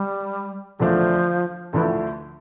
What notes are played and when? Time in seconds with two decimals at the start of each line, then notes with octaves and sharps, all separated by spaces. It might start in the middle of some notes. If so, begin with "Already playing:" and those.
Already playing: G3
0.80 E2 D3 F3 A3 D4
1.73 D2 D3 E3 F3 A3 E4